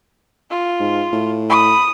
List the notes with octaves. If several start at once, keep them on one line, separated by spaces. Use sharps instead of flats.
F4
G#2
A2
B5 D#6